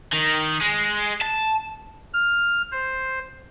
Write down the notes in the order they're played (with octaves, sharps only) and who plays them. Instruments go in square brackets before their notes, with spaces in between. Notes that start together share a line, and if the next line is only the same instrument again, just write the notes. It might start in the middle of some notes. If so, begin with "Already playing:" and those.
[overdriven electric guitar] D#3
G#3
A5
[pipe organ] F6
C5